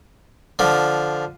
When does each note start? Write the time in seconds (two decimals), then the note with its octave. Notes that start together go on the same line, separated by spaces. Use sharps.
0.59 D3 F3